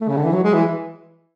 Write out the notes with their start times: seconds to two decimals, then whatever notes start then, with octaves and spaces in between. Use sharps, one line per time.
0.01 A3
0.09 C#3
0.17 D3
0.24 E3
0.33 F#3
0.44 G#3
0.54 E3